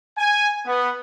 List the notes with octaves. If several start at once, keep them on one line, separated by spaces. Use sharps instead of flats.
G#5
B3